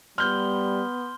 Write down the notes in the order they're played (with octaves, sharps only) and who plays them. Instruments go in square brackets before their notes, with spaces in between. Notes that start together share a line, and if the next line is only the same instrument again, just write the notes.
[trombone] G3 [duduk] B3 [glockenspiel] C6 G7 [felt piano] F6 G6